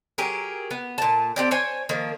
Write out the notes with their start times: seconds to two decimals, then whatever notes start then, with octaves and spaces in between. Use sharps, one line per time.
0.18 F#3 G4 G#4 A#4
0.71 B3
0.98 A#2 A5
1.36 C4 G4 D5
1.51 C5 C#5 G#5
1.89 D#3 F3 A#3